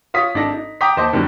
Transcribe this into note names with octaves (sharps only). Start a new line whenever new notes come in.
F4 C#5 D#6 B6
G#1 D4 D#4 A4 A#6
D#4
G5 A#5 D6 D#6 B6
D#2 C5 D#5 A5 D6
F#2 D3 D#3 F#3 G3